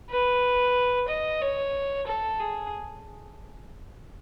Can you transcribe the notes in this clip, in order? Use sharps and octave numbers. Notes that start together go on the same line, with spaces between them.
B4
D#5
C#5
A4
G#4